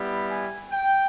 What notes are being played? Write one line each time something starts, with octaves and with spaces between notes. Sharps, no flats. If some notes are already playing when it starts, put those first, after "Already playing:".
Already playing: G3 B3 E4 G4
G#5
G5